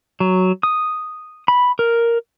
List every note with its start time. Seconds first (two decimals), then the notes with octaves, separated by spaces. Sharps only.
0.20 F#3
0.63 D#6
1.48 B5
1.79 A#4